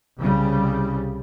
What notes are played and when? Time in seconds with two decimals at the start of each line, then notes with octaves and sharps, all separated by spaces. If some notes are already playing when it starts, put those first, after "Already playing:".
0.19 C2 C#3 G3